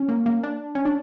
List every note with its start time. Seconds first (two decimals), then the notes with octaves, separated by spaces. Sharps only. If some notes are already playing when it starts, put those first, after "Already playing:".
Already playing: C#4
0.08 A#3
0.26 A#3
0.43 D4
0.75 C#4
0.85 D4